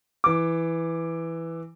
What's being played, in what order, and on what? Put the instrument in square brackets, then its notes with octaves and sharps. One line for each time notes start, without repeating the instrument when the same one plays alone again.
[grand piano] E3 D6